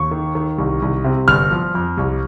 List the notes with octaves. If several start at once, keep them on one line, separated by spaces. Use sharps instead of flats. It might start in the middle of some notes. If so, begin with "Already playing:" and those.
Already playing: D#2 C#6
D#3
D#3
C2
C2
C3
G1 F6
F3
F2
C2